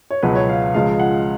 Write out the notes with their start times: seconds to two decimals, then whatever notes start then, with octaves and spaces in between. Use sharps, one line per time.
0.10 C#5
0.23 C#2 B2 F#3 B4
0.35 C#5
0.49 F5
0.61 F5
0.74 C#2 C#3 F3 G#3 F5
0.99 F#5